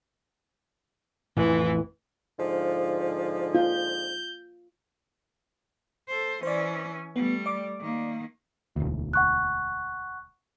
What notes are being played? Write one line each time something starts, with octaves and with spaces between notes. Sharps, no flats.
A1 F2 E3
G#2 D3 F3
F4 G6
A4 C5
E3 C#4 C5 D5
G3 A3 B3
D5 D6
D#3 A#3
E1 D2
F#5 C#6 F#6